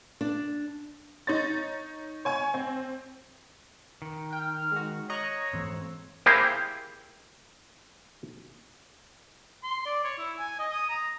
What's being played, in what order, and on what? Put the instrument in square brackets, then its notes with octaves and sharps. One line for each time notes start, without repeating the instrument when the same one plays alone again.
[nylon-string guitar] D4
[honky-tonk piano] D#4 C#5 A6
C#5 G#5 C#6
C4
[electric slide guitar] D#3
[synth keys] G5 [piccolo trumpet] F6
[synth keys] G#3 F#4
[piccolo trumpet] C#5 [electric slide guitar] D#5 [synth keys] A#5 C#6 F#6
[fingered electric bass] G#2 E3 [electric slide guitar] C4
[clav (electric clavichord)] A#3 E4 G4 G#4 A#4 C5
[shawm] C6
D5
C#5
E4
G#5
D#5
D#6
A#5